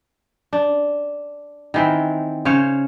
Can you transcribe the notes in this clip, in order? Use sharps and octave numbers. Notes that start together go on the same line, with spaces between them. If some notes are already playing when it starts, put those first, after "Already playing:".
D4
D#3 E3 C4
C#3 C5 C#5 F5